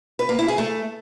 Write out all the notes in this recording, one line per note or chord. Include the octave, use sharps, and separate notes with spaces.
B4
A#3
E4
G#4
A3